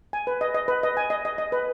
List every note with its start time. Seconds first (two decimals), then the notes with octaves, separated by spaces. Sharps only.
0.13 G#5
0.27 B4
0.41 D#5
0.54 D#5
0.68 B4
0.83 D#5
0.97 G#5
1.10 D#5
1.25 D#5
1.38 D#5
1.52 B4